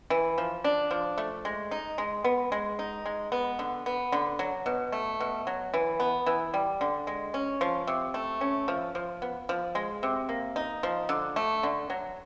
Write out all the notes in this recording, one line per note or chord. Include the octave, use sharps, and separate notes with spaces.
E3
F3
D4
F3
A3
G#3
D#4
G#3
B3
G#3
D#4
G#3
B3
D3
B3
D3
F#3
B2
A3
B2
F#3
E3
B3
E3
G3
D3
G#3
C#4
F3
C3
A3
C#4
F3
F3
B3
F3
G#3
C3
A#3
D#4
F3
D3
A3
D3
F#3